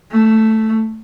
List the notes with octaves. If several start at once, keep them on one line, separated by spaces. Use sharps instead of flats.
A3